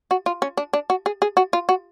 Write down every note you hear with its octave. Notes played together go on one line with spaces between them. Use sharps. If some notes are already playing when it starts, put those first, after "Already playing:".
F#4
F4
C#4
D4
D4
F#4
G#4
G#4
F#4
F4
F#4